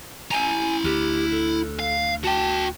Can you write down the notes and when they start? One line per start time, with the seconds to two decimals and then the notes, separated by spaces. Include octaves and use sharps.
0.31 E4 G#5 A#5
0.84 D2 G4
1.31 A4
1.79 F5
2.24 F#4 G5 A5